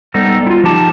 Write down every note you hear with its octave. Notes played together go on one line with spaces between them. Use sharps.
G3 B3 D#4 A4 C5
E4 F4
F3 D#4 G4 A5